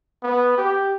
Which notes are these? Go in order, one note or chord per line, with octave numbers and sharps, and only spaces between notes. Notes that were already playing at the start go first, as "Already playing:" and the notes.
B3
G4